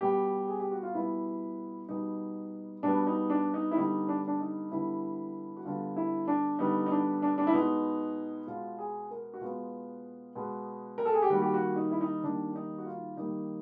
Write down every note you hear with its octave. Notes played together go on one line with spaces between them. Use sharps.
B2 G3 B3 G4
G#4
G4
F#4
F4
B2 G3 B3 E4
B2 G3 B3 D#4
B2 G3 B3 D4
D#4
D4
D#4
E4
D3 G3 B3 D#4
D4
D4
D#4
D3 G3 B3 E4
F#4
D3 G3 B3 F4
E4
D4
D3 G3 B3 D#4
D#4
D4
D4
D4
E4
B2 G#3 B3 D#4
B2 G#3 B3 F4
G#4
A#4
F#4
B2 G#3 B3 F4
B2 G#3 B3
A#4
A4
G#4
G4
D#3 G3 A#3 F#4
G4
F#4
D#4
E4
D#4
D#3 G3 A#3 D4
D#4
F#4
F4
D#3 G3 A#3 D#4